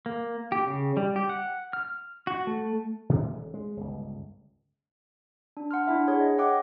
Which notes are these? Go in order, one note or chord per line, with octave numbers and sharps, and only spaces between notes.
A#3
G4
C#3
G3
G4
F#5
F6
F#4
A3
B2 E3 G#3 B3
D#1
G#3
G1 C#2
D4
F#5 C6 F6
D4 E4 E5
G#4 C#5 F#5
D#5
D#5 E5 F#5 G5 D6 F#6